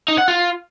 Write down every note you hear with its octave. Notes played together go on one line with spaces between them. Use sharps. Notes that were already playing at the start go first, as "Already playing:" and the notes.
D#4
F#5
F4